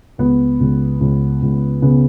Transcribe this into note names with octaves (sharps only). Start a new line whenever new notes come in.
C#2 B3
C#2
C#2
C#2
C#3 B3